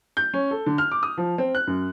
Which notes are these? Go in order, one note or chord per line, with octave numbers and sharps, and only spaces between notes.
G6
C#4
A4
D3
F6
D6
D#6
F3
C4
F#6
F#2